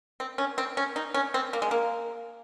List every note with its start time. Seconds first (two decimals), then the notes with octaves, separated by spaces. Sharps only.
0.20 C4
0.38 C#4
0.58 C4
0.77 C#4
0.96 D#4
1.14 C#4
1.34 C4
1.53 A#3
1.62 G#3
1.71 A#3